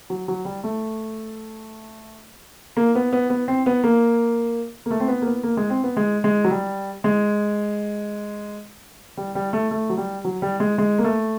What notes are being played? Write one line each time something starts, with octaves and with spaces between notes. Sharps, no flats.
F#3
F#3
G3
A3
A#3
B3
B3
B3
C4
B3
A#3
A#3
A3
C4
B3
A#3
B3
A#3
G#3
C4
B3
G#3
G#3
F#3
G3
G#3
G3
G3
A3
A3
F#3
G3
F#3
G3
G#3
G#3
A#3
A3